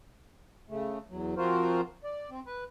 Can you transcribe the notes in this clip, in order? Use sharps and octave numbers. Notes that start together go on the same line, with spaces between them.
C#3 A3
E2 F#3
F3 C4 F4 F#4 A#4 C5
D5
C4
B4